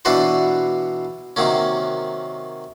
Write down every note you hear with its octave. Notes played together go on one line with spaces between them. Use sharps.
B2 E3 D4 F#4 B4 C5
C3 D#3 F#3 A#3 C#4